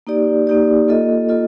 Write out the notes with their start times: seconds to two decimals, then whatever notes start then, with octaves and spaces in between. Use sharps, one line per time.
0.07 A#3 D#4 G4 D5
0.47 A#3 D#4 G4 D5
0.88 A#3 F4 A4 D#5
1.29 A#3 F4 A4 D#5